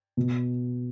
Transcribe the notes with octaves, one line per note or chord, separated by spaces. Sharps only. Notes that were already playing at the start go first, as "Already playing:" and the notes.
B2